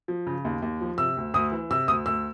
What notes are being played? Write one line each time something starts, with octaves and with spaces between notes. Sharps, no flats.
F3
C#3
D#2
D#2
F3
C3 E6
D2
D2 D#6
E3
C3 E6
D2 D#6
D2 E6